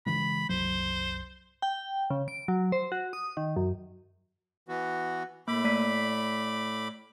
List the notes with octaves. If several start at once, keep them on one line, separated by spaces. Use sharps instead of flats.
C#3 E3 G#3 B5
F#1 C2 F#3 C5
G5
C#3
D7
F#3
C5
F#4
D#6
D#3
F#2
E3 B3 F#4
A2 A#3 B5 D6
A3 D5 B6